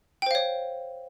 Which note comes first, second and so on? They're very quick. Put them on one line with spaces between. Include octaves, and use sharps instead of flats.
G5 C5 F5 C#5